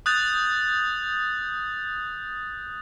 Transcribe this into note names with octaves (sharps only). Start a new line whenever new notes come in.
D#6 F#6 G6 A6 F7